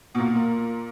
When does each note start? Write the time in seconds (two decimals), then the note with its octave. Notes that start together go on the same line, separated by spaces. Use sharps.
0.15 B2
0.18 A#2 A#3
0.36 A#3